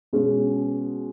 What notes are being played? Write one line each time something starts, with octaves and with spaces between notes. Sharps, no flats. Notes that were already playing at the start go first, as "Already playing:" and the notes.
B2 G#3 C#4